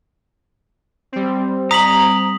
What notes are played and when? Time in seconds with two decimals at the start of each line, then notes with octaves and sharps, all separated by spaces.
1.12 G3 C4
1.71 A#5 D#6 B6 F#7